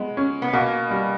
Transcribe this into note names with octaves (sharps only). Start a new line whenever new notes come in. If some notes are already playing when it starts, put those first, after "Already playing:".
Already playing: G#3 B3
C#4
B3
B2 A#3
G3